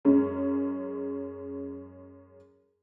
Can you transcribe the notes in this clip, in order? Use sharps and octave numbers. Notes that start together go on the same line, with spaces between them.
F#2 G#3 C#4